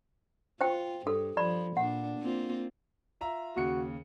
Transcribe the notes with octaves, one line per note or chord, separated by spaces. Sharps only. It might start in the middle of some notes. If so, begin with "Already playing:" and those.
F4 C5 G5
G2 A4
F3 D5 B5
A#2 D4 F#5
A#3 C4 F4
F4 E5 A#5
D#2 C#3 F#4 C#7